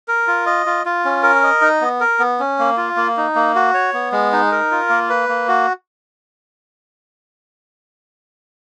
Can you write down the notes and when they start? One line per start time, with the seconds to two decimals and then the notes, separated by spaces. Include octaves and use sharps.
0.08 A#4
0.28 F4
0.46 D#5
0.66 F4
0.86 F4
1.05 C#4
1.23 A#4
1.43 D#5
1.62 D#4
1.81 B3
2.00 A#4
2.19 B3
2.40 C#4
2.59 A#3
2.77 F4
2.97 A#3
3.17 D#4
3.35 A#3
3.55 F#4
3.74 C#5
3.93 B3
4.12 G#3
4.33 D#4
4.52 A#4
4.71 F4
4.89 A#3
5.09 B4
5.29 A#3
5.48 F#4